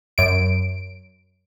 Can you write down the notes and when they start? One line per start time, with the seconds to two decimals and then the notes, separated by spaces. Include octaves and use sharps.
0.18 F#2 D7